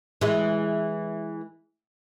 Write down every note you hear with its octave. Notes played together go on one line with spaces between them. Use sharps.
E3 G#3